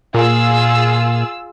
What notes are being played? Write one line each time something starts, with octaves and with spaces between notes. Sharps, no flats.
A#2 F4 G#4 E6